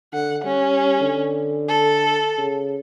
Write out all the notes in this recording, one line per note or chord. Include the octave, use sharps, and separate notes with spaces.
D3 F#5
G3 C#4
D3
A4
C#3